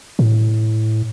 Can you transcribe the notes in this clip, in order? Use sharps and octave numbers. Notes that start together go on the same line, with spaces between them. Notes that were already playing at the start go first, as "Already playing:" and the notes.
A2